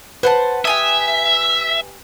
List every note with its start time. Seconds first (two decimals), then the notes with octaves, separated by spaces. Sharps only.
0.23 B4 C5 F#5 A5
0.65 G4 E5 G#5 D#6